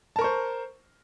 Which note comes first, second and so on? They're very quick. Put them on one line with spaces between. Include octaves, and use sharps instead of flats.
A5 A#4 C#6 C5